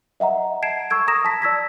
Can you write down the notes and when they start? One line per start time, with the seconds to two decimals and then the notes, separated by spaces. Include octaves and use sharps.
0.20 D#5 E5 F#5 A#5
0.62 A5 G#6 C7 D7 E7
0.90 C#6 E6 G#6 D7
1.07 A#5 C#6 D#6 A#6 E7
1.25 A5 B6
1.42 D5 E6 G#6 B6